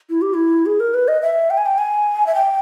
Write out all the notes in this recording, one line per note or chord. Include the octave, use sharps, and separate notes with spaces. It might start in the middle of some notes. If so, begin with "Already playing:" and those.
E4
G4
E4
G#4
A#4
B4
D#5
E5
G5
G#5
G5
G#5
E5
G5